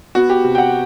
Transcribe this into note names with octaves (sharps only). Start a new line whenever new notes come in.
B3 F#4
G4
C3
G5
F#5